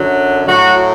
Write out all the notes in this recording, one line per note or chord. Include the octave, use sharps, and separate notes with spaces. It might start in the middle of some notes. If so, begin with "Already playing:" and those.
Already playing: F#2 D3 F#3
A2 F#3 F#4